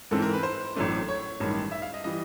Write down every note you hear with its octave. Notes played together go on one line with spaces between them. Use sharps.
G#2 E3 G#3 C4 A4
A#4
B4
C5
A1 A2 F#3 A3 D4
C#5
A1 G2 D#3 G#3
E5
F5
D#5
E3 G3 D#5